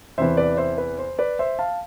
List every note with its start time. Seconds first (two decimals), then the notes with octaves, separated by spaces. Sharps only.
0.18 E2 C3 E3 C5 E5
0.37 B4 D5
0.58 C5 E5
0.78 B4
0.99 C5
1.19 B4 D5
1.39 C5 E5
1.59 F5 A5